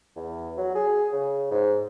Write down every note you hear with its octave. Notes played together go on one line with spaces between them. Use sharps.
E2
F#3
G#4
C#3
G#2